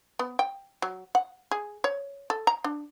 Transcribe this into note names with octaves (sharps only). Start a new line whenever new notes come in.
B3
G5
F#3
F#5
G#4
C#5
A4
A#5
D4